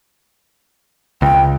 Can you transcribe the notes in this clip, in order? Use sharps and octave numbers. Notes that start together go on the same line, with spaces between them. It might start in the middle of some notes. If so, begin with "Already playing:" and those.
C#2 G5